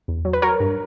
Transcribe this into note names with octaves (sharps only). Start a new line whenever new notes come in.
E2
F#3
B4
F#3 A#4 C#5
G2